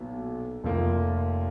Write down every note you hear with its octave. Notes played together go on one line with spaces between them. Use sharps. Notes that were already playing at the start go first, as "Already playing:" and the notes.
Already playing: B1 A#2 F#3 B3
F1 F2 F3 A#3